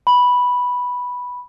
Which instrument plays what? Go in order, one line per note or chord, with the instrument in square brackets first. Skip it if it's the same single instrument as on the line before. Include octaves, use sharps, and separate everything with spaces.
[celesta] B5